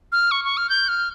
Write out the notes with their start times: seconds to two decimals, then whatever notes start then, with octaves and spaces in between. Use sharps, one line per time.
0.12 F6
0.31 C#6
0.45 C#6
0.57 F6
0.69 G6
0.89 F6